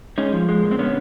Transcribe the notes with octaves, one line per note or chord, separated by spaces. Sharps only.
G#3 C#4 D#4
F3
G#3
A#2
C4
D3 B3 C#4